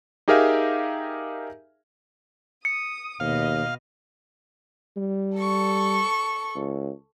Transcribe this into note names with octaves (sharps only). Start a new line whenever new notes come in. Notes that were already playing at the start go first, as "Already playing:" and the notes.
D#4 G4 G#4 A#4 E5 F5
D#6 C#7
D#2 B2 D#5 F5
G3
A4 C#6
C#2